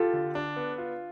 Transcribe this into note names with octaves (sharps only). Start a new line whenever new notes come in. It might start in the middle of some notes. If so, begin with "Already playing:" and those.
Already playing: F4 G4 A4
D3
D4
B3
F4